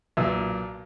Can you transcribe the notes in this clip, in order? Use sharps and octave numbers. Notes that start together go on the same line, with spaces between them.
B1 A#2 E6